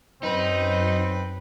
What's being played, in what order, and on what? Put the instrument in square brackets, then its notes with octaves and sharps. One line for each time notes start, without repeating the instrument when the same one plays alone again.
[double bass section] F#2 [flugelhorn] C4 [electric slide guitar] D#4 [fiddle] B4